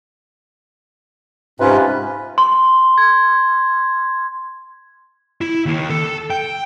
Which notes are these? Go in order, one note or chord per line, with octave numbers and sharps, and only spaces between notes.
G#2 C3 C#4 F4 B4
C6
G#6
E4
D#2
A4
G5